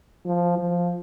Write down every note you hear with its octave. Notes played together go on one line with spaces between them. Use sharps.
F3
F3